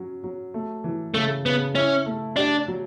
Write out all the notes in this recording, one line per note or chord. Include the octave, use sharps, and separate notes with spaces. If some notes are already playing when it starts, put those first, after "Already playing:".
Already playing: F#3 C#4
F#3
A3
E3
C#3 A3
C#3 B3
C#4 E4
A3
D4 G4
F#3